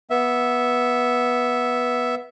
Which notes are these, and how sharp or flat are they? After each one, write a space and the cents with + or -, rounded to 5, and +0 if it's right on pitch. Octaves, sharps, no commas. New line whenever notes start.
B3 -10 E5 +0